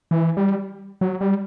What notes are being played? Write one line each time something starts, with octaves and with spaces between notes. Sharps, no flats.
E3
G3
F#3
G3